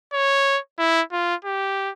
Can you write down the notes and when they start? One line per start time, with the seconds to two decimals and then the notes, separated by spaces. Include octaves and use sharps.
0.13 C#5
0.79 E4
1.12 F4
1.45 G4